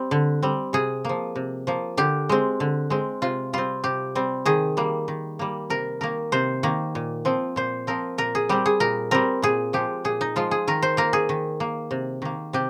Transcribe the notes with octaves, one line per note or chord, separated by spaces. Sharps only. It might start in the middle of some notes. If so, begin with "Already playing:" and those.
Already playing: G3 C4
D3
G3 C4
C3 G#4
F3 A#3
C3
F3 A#3
D3 G4
G#3 C4
D3
G#3 C4
C3 F4
G3 C4 F4
C3 G4
G3 C4
D#3 G#4
G3 A#3
D#3
G3 A#3
C3 A#4
D#3 A#3 A#4
C3 C5
D#3 A#3
A#2
F3 C4
A#2 C5
F3 C4 A#4
A#2 A#4
G#4
G3 C4 G4
G#4
A#2 A#4
G3 C4 A#4
A#2 G#4
F3 G#3 G4
A#2 G#4
D#4
F3 G#3 F4
G#4
D#3 A#4
C5
A#3 A#4
G#4
D#3
A#3
C3
D#3 A#3
C3 G4